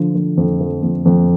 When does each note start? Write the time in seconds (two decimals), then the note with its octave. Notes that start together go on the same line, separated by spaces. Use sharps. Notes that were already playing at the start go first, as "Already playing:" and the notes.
Already playing: D3 F3
0.15 F3
0.37 F2
0.61 F3
0.83 F2
1.05 F2